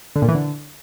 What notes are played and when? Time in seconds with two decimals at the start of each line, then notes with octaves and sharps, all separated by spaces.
0.16 D3
0.22 A#2
0.28 E3
0.35 D3